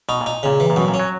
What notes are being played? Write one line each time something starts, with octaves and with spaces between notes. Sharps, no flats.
B2 D#4
A#2
D#4
A#2 C#3
E3
A#2
F#2 B2
A#2
C#4
F#3